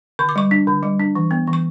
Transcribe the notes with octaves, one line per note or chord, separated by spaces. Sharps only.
D3 C#6
D6
G3 C#6
D4
D3
G3
D4
E3
B3
E3
C#6